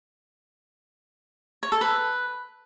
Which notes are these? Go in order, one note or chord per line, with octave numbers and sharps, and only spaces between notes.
C#5
A4
B4